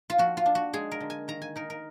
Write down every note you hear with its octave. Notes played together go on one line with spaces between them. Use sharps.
F4
F3 F#4
F4
D4
F#4
G#3 G#4
A#4
D3
G#5
D#3 A#5
G#5
D#4 A#4
A#4